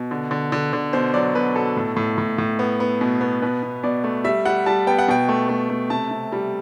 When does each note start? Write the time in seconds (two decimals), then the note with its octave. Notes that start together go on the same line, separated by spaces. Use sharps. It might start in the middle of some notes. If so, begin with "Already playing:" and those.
Already playing: B2
0.11 D3
0.31 D3
0.52 D3
0.73 D3
0.93 B2 C5
1.14 F#3 D5
1.35 B2 B4
1.56 B2 A4
1.76 A2
1.96 A2
2.18 A2
2.38 A2
2.59 B3
2.80 B3
3.01 B2
3.21 B3
3.42 B2 B4
3.63 B2
3.83 B2 D5
4.04 A3
4.24 G3 E5
4.45 G3 F#5
4.66 G3 A5
4.87 B3 G5
4.99 F#5
5.08 B2 G5
5.29 A3
5.49 A3
5.70 A3
5.90 C3 A5
6.11 C3
6.32 G3